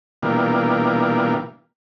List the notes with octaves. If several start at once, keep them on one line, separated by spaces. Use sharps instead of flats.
B2 E3 G3 A#3 D4 F4